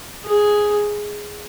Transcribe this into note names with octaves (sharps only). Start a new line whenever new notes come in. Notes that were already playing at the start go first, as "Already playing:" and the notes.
G#4